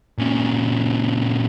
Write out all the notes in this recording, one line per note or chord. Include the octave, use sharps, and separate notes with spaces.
A#2 C#3